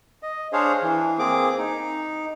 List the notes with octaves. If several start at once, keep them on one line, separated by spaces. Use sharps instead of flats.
D#5
D4 G#4 C5 C#5 F5
E3
A#3 C4 G#4 D6
D#4